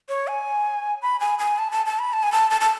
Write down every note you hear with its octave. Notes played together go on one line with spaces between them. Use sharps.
C#5
G#5
B5
G#5
G#5
A5
A5
A5
B5
A5
G#5
A5
A5
A5